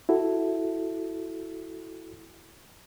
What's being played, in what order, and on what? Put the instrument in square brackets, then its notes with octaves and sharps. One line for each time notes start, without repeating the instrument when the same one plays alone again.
[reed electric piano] E4 F#4 A4